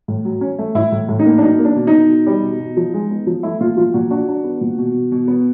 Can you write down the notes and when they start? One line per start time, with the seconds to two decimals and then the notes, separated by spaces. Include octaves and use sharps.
0.08 A2
0.25 F#3
0.41 C#4
0.59 A3
0.75 A2 E4
0.92 A2
1.09 A2
1.19 D#4
1.26 A#3
1.38 D4
1.42 F#3 D#4
1.59 A#3
1.65 D4
1.76 B2
1.87 D#4
1.93 B2
2.09 B2
2.26 G3
2.43 B2
2.60 B2
2.77 F3
2.94 G#3
3.10 B3
3.27 F3
3.43 A3 E4
3.61 A#2 F4
3.77 F3 F4
3.93 A#2 F#4
4.10 D4 F#4
4.28 D4
4.44 B3
4.61 A#2
4.78 B2
4.94 B2
5.12 B2
5.28 B3